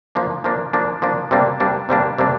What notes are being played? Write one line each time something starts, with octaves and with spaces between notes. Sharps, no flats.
F3 A#3 D4
F3 A#3 D4
F3 A#3 D4
F3 A#3 D4
C3 G3 A#3 D4
C3 G3 A#3 D4
C3 G3 A#3 D4
C3 G3 A#3 D4